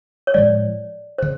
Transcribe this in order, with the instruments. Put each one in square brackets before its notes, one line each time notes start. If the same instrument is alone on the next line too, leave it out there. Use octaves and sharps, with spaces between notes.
[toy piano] C#5
[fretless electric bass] A2 F3 G#3 [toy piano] D5
[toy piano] C5
[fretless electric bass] C#3